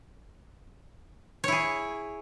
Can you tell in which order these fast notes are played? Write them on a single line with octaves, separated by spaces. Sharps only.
C#5 E4 G#4